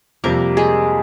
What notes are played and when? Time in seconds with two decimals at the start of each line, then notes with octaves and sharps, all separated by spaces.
0.24 F2 C3 G3 A#3 A#4
0.57 G#3 G#4